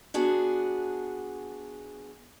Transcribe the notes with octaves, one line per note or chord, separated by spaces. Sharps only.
B3 D4 F#4 G#4